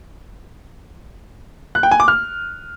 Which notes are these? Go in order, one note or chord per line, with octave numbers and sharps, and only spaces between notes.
F#6
G5
G#5
D6
F6